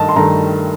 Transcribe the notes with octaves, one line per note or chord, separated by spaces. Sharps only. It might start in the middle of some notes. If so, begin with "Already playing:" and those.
Already playing: G2 D#3 A3 D#5 A5
C6
G2 D#3 A3 A#5